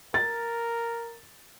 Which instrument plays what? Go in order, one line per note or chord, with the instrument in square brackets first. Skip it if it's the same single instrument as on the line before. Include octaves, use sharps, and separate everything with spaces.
[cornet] A#4 [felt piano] A6